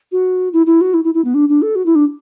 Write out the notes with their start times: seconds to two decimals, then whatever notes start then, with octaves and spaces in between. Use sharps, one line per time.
0.12 F#4
0.53 E4
0.66 E4
0.81 F#4
0.94 E4
1.04 E4
1.14 E4
1.24 B3
1.34 D4
1.49 D4
1.62 A4
1.75 F#4
1.86 E4
1.95 D4